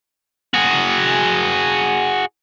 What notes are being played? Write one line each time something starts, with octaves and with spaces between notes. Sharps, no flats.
F#4 G#4